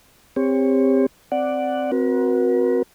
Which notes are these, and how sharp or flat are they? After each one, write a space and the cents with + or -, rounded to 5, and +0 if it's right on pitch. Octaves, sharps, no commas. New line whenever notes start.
C4 +0 G4 +35 C#5 +0
C4 +0 D5 +0 F#5 +0
C4 -5 F#4 -10 A#4 +45